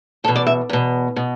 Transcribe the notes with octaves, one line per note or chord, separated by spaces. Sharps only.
E2 B2 A4
D5
E5
E2 B2
B2